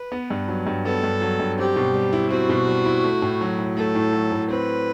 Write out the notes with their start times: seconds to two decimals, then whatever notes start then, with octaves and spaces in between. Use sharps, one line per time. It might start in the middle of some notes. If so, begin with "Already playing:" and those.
Already playing: B4
0.12 B3
0.30 G2
0.48 F#3
0.67 G2
0.85 B3 A4
1.04 G2
1.22 F#3
1.40 G2
1.58 C4 G4
1.76 B2
1.94 G3
2.13 E4
2.30 C4 F#4
2.49 B2
2.68 G3
2.86 E4
3.04 A3
3.22 A2
3.41 F#3
3.59 A2
3.77 A3 A4
3.95 A2
4.13 F#3
4.32 A2
4.50 C4 B4